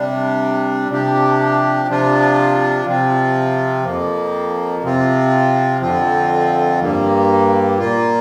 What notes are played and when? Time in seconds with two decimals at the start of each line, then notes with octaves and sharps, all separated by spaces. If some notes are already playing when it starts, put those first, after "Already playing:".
Already playing: C3 G3 D4
0.89 C3 F3 D4 G4
1.88 C3 F3 D4 F4
2.85 C3 F3 C4 F4
3.85 F2 F3 A#3
4.83 C3 F3 C4 F4
5.81 F2 D3 F3 C4 F4
6.80 G2 G3 A#3
7.78 A#2 A#3 F4